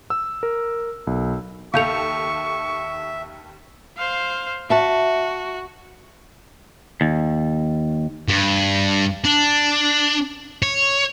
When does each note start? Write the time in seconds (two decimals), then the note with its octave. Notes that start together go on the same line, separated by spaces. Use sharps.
0.10 E6
0.43 A#4
1.07 B1
1.74 D#2 A4 E5 F5 C#6 G6 C#7 F7
3.97 C5 F5
4.70 F#4 E5 A5
7.01 D#2
8.29 G2
9.25 D4
10.63 C#5